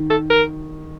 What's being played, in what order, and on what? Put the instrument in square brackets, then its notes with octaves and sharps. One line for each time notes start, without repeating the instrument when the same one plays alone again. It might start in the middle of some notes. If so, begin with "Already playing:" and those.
Already playing: [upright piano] D#3
[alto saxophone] A4
A#4